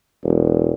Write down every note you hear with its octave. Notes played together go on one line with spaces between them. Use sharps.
E1